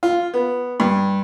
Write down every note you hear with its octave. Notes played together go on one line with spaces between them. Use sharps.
F4
B3
G2